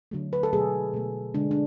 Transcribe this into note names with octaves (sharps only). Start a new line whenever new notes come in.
D3 F#3 A3
B4
A4
B2 F#3 A3 G#4
B2 A3
D3 G#3 D4
D4